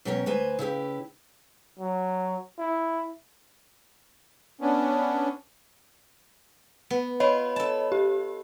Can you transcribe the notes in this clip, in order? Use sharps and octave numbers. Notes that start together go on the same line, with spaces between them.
B2 F#3 C#4 G4 A#4
D2 B4 C5 G#5 A#5
C#3 E4 G4 B4
F#3
E4
B3 C#4 D4
B3
F4 C#5 D#5 B5
A4 A5
G4